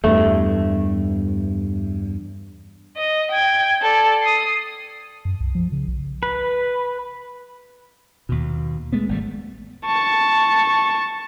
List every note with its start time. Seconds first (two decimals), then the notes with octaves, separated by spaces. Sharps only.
0.04 E2 G2 A3
2.97 D#5
3.31 G5 G#6
3.82 A4 D5
4.22 D#6 C7
5.25 F#2
5.41 C2
5.55 F3
5.72 C#3
5.88 B1
6.23 B4
8.29 D#2 B2
8.93 G#3 A3 B3
9.09 G#1 G3 A3
9.86 A5 C#6